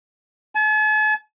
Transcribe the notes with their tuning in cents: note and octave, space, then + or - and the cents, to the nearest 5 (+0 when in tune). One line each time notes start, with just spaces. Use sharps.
A5 -45